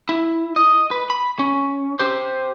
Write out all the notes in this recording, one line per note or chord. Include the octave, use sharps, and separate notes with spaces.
E4
D#5
B4
B5
C#4
G4 C5